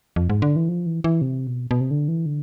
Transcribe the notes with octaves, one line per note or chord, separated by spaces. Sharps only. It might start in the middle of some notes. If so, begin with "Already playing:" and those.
F2
G#2
D3
E3
F3
E3
E3
C3
B2
B2
C3
D3
E3
D3